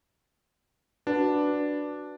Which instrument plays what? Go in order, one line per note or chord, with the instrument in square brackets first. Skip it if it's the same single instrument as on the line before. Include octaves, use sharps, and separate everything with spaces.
[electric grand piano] D4 [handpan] F#4 B4